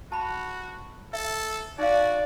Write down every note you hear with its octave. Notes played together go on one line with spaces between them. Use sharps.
F#4 A5 B5
A4 E5
D#4 F#4 D5 F5